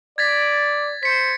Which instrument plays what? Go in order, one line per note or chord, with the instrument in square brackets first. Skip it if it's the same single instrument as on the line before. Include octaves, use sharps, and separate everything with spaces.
[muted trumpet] D5 [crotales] G#6 A6 B6
[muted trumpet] C5 [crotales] B6 C#7